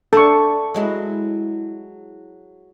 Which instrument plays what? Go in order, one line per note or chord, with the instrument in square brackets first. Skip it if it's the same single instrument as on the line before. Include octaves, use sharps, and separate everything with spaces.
[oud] D4 [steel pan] A4 C#6
[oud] F#3 G#3 E4